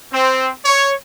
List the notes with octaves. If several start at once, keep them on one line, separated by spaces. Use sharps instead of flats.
C4
C#5